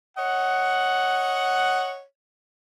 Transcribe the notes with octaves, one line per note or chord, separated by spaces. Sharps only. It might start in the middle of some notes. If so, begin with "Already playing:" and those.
C#5 D#5 F#5